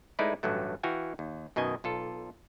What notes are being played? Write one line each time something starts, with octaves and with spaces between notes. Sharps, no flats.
G#3 A3 D#4 E4 B4 D5
A1 G2 F#3 A3
E3 F#4 F5 G5 G#5
D#2
F#2 B2 D#3 D#5 G#5
B1 F4 A4